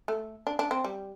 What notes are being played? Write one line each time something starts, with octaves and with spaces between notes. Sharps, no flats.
A3
D4
D4
C4
G3